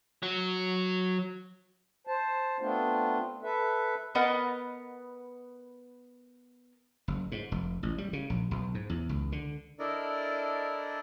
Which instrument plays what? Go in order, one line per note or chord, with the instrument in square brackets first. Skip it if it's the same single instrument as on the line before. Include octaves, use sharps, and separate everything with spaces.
[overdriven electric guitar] F#3
[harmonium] C5 A5
A3 B3 C4 D4 F4
A4 B4 E5
[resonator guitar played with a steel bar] B3 A#4 B4 D#5 F#5
[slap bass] F#1
G#2
F1
A1
G3
C#3
A#1
B1
G#2
E2
C#2
D3
[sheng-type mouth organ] D4 E4 A4 A#4 D5 D#5